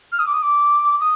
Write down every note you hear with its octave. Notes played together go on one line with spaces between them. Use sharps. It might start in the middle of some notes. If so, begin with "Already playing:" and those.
F6
D#6
D6
D#6
D6
D#6